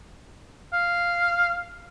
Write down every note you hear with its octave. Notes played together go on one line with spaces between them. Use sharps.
F5